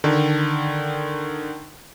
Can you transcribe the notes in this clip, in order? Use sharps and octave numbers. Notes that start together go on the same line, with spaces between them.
D3 D#3